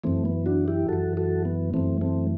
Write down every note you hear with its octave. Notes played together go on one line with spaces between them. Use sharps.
F#2 E3 A3 C4
B3
D4 F#4
E4 G4
F#2 E3 F#4 A4
F#4 A4
B3
F#2 E3 A3 C4
A3 C4